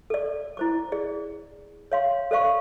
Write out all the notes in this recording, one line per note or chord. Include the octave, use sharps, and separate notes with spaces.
A4 D5
E4 C5 D6
G#4 D5
C#5 F5 C6
A4 C5 D5 F5 C#6